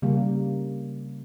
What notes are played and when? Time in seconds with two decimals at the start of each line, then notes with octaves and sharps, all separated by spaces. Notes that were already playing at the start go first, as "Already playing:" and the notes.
0.02 C#3 G3 A#3